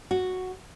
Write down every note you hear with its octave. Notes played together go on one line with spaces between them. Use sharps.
F#4